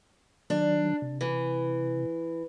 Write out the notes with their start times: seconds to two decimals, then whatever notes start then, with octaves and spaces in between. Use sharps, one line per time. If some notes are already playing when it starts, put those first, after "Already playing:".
0.50 D#3 F#3 D4
1.02 C3
1.21 E3